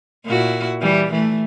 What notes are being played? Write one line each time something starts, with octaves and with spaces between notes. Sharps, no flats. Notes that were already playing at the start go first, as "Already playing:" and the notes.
A#2 E4 F#4
E3 G3
E3 A3